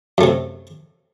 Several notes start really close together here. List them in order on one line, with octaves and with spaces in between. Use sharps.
F#2 A3 C3